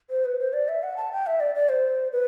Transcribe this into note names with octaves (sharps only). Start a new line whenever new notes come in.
C5
B4
C5
D5
E5
F#5
A5
G5
E5
D5
D5
C5
B4